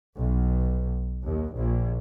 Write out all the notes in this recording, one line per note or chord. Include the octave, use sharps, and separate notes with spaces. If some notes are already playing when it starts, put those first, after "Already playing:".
B1
D#2
A#1